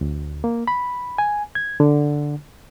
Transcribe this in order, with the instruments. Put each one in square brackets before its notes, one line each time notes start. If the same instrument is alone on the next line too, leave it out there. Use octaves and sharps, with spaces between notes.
[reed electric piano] D2
A#3
B5
G#5
G#6
D3